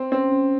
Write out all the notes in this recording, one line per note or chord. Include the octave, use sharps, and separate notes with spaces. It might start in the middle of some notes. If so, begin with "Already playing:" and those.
Already playing: C4
C4 C#4
C#4